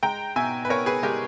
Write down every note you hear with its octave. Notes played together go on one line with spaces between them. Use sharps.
G#3 G5 A#5
B2 E5 G#5
B4
B2 A#4 C#5
G#4 B4
G#3 G4 A#4